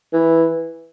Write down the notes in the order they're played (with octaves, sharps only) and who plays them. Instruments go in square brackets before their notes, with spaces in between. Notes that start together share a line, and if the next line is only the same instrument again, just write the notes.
[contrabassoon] E3